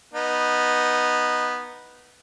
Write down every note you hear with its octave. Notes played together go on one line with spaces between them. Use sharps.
B3 D#4